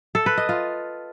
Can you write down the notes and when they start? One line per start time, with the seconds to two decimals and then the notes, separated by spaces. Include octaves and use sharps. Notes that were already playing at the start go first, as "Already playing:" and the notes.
0.15 A4
0.26 B4
0.38 D#5
0.49 F4